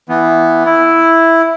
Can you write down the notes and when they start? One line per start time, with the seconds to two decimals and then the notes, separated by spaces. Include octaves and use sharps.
0.09 E3 B3
0.65 E4